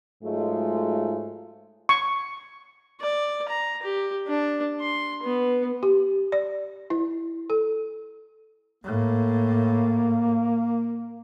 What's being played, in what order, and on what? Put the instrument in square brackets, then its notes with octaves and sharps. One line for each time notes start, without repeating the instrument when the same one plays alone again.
[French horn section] G#2 F#3 G#3 A3 F4
[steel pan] C#6
[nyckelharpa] D5
A#5
G4
D4
C6
B3
[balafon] G4
D5
E4
A4
[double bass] A2 [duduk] A#3